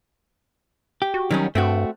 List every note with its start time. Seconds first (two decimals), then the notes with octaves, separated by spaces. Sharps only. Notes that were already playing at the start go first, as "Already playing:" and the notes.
1.02 G4
1.14 F#4
1.31 D#3 F#3 G3 C#4
1.55 G2 A3 C4 F#4